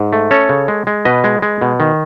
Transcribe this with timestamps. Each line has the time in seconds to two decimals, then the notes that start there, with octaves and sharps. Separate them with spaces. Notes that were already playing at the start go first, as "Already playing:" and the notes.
Already playing: G#2
0.13 A3
0.31 C#4 A4 C#5
0.49 C#3
0.68 G#3
0.87 G#3
1.05 B2 B4 D#5
1.24 G#3
1.42 G#3
1.61 B2
1.80 D#3